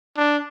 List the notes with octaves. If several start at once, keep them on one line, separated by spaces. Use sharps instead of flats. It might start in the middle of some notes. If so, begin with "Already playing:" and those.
D4